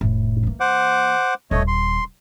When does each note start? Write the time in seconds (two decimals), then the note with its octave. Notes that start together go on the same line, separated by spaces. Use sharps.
0.01 F1 A2
0.43 E3 A#3
0.60 C5 F#5 D6
1.51 D#1 A3 F4 C#5 D#5
1.68 C6